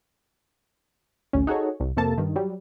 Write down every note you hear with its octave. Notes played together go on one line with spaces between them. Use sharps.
A1 D2 C#4
D#4 F#4 G#4 A4 C#5
C2
F2 C3 A#3 A4 A5
G2 D#3
F#3 G3